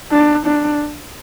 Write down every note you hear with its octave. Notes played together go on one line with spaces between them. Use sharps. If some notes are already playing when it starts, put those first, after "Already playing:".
D4
D4